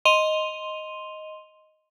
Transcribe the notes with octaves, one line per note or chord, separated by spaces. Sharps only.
D#5 C6 D#7 F7 G7